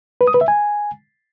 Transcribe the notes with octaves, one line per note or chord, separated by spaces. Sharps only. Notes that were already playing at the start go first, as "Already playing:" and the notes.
B4
D#6
B4
E5
G#5